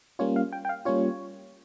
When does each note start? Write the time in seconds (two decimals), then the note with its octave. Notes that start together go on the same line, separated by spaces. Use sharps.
0.19 G3 A#3 C#4 F4 C#5
0.36 F5
0.53 G5
0.65 G5
0.69 F5
0.85 G3 A#3 C#4 F4 C#5